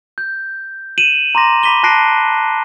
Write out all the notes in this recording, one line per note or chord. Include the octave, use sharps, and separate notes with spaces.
G6
D#7 E7 F#7
A#5 C6 D6 A#6
B5 D6 B6 D#7 G7
A5 F#6 A#6 C7 D7